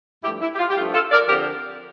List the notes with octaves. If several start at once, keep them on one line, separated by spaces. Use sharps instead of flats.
G2 F3 A3 E4 G4
E4
G4
F4
G4
G2 F3 A3 F4
F4 A4
A#4 D5
D3 F3 C4 G4 A#4